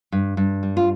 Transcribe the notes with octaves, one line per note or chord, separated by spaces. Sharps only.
G2
G2
G3
F4